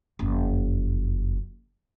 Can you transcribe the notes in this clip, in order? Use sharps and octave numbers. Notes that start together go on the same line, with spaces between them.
F#1 F2